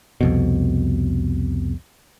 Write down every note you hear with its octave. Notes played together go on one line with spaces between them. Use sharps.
C2 F2 B2